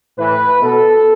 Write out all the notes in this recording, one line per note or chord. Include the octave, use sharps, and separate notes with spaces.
A2 E3 B4
B2 A4